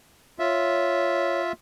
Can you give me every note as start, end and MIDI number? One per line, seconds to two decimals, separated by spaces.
0.39 1.52 65
0.39 1.41 73
0.39 1.52 76